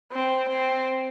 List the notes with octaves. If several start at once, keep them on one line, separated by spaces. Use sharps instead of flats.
C4
C4